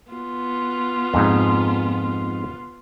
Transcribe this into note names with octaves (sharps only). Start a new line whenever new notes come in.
B3 F4
F2 G#2